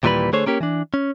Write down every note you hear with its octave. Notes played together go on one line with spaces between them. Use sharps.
D#2 A#2 E3 G3 B4 B5
D3 A3 G#4 C5 C#5
A#3 C#4 G4 A#4
E3 D4
C#4